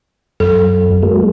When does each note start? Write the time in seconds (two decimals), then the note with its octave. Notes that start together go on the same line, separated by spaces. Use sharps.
0.40 F#2 A4
1.03 F#3 G#3 A#3